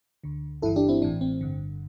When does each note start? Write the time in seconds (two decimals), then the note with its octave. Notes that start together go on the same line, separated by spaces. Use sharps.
0.24 D2 D3
0.62 G1 G2 E3 E4 A4
0.76 D4 G4
0.88 C4 E4
1.02 A1 A2 E3 D4
1.21 C4
1.41 G1 G2 D3